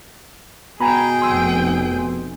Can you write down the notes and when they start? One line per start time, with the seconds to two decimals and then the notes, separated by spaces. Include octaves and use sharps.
0.81 B2 G#4 G5 G#5 A#5 B5
1.22 F1 C6 E6